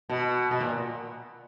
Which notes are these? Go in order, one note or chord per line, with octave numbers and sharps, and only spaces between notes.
B2
B2
A#2